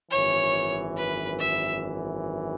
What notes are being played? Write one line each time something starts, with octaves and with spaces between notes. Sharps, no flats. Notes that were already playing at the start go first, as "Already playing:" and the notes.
G#1 F#2 E3 C#5
B4
E5